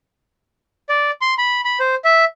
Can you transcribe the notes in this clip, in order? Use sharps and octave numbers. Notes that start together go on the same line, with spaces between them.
D5
C6
B5
B5
C5
E5